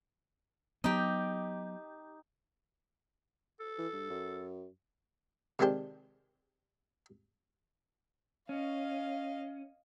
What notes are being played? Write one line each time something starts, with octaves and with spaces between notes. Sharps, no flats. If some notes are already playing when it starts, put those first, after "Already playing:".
F#3 B3 D#4 G4
A4
E3
G2
F#2
C3 D#3 G#3 D4 G4 C5
C#4 D#5 F5